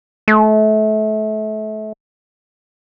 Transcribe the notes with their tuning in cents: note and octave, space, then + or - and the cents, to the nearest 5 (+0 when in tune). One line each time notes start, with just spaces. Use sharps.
A3 -30